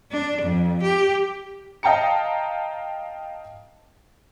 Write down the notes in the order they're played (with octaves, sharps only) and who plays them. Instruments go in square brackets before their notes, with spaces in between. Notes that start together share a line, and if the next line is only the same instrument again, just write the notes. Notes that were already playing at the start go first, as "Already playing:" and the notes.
[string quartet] D4
F2
G4
[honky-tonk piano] D#5 F5 G5 A5 A#5 C#7